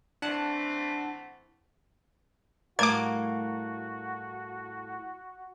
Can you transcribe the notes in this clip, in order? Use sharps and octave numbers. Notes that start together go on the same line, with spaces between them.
E3 A3 C4 D4 F#5 A5
A2 G3 A3 A#3 F#4 D6 G#6